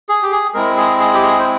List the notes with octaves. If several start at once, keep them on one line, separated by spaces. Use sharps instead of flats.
G#4
G4
G#4
G#3 C4 E4 A#4
G#4
G#4
G4
G#4
C5